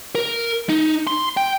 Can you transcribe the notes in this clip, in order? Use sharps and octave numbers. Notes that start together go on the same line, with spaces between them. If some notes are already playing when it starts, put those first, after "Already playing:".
A#4
D#4
C6
G5